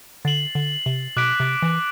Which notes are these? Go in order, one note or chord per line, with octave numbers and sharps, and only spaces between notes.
D3 A6 C7 F#7
D3
C3
B2 D6 F#6 B6 D7
C3
E3